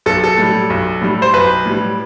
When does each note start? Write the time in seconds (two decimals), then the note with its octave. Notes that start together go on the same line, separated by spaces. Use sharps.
0.06 B1 A4
0.24 A4
0.38 A2 G3
0.70 B1
1.01 A2 G3
1.22 C5
1.34 B1 B4
1.66 A2 G3